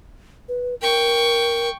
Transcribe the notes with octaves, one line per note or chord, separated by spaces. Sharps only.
B4
A#4 G5 C#6